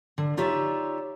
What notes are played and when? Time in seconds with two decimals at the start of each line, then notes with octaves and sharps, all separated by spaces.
0.18 D3
0.37 D#4 F4 G4 C#5 D5 E5